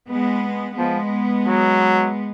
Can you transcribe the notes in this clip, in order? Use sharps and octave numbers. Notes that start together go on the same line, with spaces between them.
G#3 B3
F3 G#3 B3
F#3